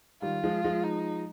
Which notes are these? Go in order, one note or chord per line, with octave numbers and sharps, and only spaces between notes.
D#3 G3 F4
F3 G#3
F3 G#3
D#4